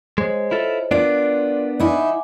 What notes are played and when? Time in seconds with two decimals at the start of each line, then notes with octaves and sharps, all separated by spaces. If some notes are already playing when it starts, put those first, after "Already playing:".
0.18 G#3 C5 C#5 D#5
0.51 E4 F4 A4
0.91 B3 D4 F4 A#4 D5
1.80 D#4 E4 F#5 G#5 D6